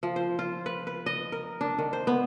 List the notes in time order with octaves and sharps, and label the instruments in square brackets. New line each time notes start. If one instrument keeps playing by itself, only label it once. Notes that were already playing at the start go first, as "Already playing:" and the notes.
[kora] F3
C5
F4
B4
B4
D#5
A#4
D4
D#3
C5
B3